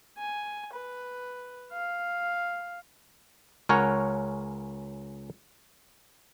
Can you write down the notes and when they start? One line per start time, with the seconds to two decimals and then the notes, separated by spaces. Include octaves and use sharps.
0.18 G#5
0.73 B4
1.73 F5
3.69 C#2 C#4 A#4 C#5 F#5